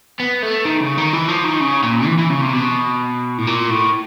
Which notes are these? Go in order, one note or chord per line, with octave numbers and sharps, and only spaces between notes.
B3
A3
D#3
C#3
D#3
E3
F3
D#3
C#3
A#2
E3
E3
C#3
C3
B2
A2
A#2
A2